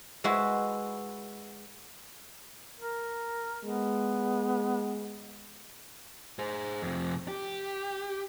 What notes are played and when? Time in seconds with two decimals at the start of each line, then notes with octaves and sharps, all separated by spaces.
0.24 G#3 E4 F#4 B4
2.80 A#4
3.64 G#3 B3
6.39 G#4 C5
6.82 F2 C3
7.28 G4